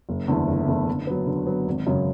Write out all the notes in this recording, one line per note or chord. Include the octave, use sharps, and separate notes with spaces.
F#1
E2 D3 A3 E4
F#1
E2 D3 A3 E4
D3
F#3 B3
D3
F#3 B3
G#1
F#2 C#3 F#3